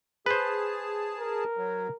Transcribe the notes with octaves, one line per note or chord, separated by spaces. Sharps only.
G#4 B4 C5 A5
A#4
F#3